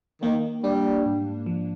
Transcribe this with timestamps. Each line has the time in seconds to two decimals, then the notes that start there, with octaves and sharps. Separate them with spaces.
0.22 D#3 A#3
0.64 G3 D4
1.06 G#2
1.46 F3